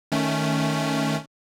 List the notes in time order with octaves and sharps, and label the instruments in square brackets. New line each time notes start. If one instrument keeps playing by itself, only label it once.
[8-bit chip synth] D#3 A3 C#4